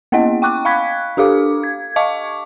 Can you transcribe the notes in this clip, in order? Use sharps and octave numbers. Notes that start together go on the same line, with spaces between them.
A#3 B3 C#4 E4 D#5 F#5
G5 C#6 D6 F#6
F5 B5 C#6 F#6 G#6 B6
D4 G4 A4 F5 D6
G#6
D#5 F5 A5 C#6 D6